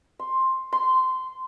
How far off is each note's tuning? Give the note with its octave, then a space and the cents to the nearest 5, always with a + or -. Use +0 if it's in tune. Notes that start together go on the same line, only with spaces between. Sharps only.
C6 +10
C6 -15